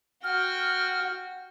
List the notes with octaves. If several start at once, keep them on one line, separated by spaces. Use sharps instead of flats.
F#4 G5 F6